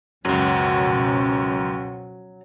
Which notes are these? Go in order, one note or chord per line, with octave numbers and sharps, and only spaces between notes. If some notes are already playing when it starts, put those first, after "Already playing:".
C#2 F#2 B2 F3 F#3 C#4